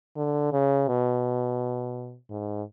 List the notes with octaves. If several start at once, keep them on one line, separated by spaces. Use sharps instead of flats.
D3
C#3
B2
G#2